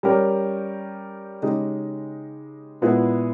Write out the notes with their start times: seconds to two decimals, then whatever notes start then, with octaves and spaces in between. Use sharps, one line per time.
0.03 G3 C#4 G4 A#4
1.42 C#3 G#3 D#4 G4
2.81 A#2 G#3 B3 E4 G#4